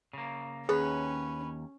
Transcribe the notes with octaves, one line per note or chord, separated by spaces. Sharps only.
C#3 A#3
D#2 C#4 G#4 B4 C#5